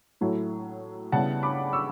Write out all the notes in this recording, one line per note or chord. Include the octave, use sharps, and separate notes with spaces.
A2 F#3 A3 E4
C#3 G3 B3 E4 F#5 A5
B5 D6
C#6 E6